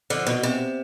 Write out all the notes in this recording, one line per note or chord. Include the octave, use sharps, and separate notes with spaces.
D3 F3
B2
C3